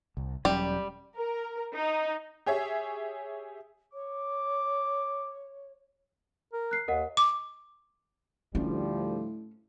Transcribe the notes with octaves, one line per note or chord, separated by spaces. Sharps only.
C2
E1 F#3 G3 C#4
A#4
D#4
G4 G#4 C#5 E5
C#5 D6
A#4
F#6 C7
D#2 A#4 D#5 F#5
D6
D2 A2 F3 G3 C#4